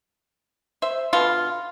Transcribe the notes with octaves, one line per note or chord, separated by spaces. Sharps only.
C5 E5
B2 D3 F4